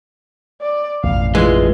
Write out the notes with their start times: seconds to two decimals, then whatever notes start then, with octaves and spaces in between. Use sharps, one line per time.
0.61 D5
1.04 A1 F2 B2 F5
1.35 E3 G#3 F4